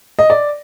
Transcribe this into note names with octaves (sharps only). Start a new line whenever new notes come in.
D#5
D5